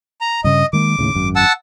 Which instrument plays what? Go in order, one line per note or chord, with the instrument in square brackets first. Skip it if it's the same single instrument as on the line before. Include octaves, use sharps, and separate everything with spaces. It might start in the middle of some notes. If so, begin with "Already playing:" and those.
[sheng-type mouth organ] A#5
[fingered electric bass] G2 C#3 [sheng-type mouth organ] D#5
[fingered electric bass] D#3 G#3 A#3 [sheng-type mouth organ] D6
[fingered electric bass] D#2 A2 C#3
G#1 F#2
[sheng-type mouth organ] F#5 A5 E6